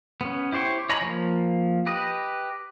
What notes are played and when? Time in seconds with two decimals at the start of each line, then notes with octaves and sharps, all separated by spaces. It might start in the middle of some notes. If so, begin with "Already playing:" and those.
0.21 B3 C#4
0.52 E4 G4 C5 G5 C#6
0.89 C#5 D#5 G#5 A#5 B5
1.01 F3 A#3
1.86 G4 B4 D#5